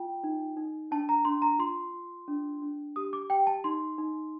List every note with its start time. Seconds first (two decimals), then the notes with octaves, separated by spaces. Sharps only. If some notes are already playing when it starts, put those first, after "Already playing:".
Already playing: F4 G5
0.24 D#4
0.57 D#4
0.91 D4 A5
1.09 A#5
1.25 D4 C6
1.42 A#5
1.59 F4 C6
1.94 F4
2.28 D4
2.62 D4
2.96 G4 D#6
3.13 D6
3.30 G4 G5
3.47 A5
3.64 D#4 C6
3.98 D#4